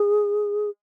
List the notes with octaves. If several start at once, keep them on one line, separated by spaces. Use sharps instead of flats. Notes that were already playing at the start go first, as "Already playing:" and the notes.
Already playing: G#4